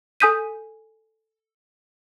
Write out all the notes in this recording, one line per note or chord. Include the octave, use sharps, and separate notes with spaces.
A4 G#5 D#6 G6 B6 D#7